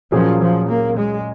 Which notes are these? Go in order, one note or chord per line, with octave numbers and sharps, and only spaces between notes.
A#2 F3 F#3 A#3 C#4 G#4
F3
A#3
G#3